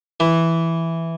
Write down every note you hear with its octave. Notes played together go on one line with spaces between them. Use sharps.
E3